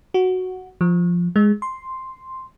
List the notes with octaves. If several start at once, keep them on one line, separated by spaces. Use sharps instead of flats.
F#4
F3
G#3
C6